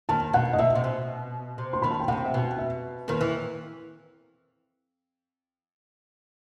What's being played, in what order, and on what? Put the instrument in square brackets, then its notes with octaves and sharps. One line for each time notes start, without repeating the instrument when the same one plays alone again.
[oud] D#2 D#3 [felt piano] A5
[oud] B2 [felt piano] F#5
[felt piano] D#5
[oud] B2 [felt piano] E5
[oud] C3
B2
C3
[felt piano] C6
[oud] D#2 D#3 [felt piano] B5
[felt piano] A5
G5
[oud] C3 [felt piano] F#5
[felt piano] E5
[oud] B2
[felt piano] G5
E5
[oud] D#2 D#3 [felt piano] B4
[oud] E3